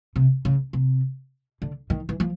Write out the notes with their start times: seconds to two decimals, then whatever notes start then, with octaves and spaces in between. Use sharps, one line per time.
0.16 C3
0.45 C#3
0.73 C3
1.62 D3
1.90 D#3
2.09 E3
2.20 F3